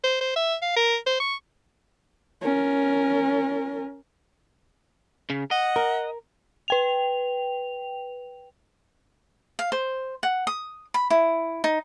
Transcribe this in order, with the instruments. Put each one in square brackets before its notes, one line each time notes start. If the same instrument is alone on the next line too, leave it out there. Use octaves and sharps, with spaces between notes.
[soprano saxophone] C5
C5
E5
F5
A#4
C5
C#6
[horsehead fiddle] C#4 A#4
[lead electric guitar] C#3
[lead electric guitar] D#5 [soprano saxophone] F#5
[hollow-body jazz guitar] A#4
[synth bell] B4 G5 F7
[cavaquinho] F5
C5
F#5
D#6
B5
E4
D#4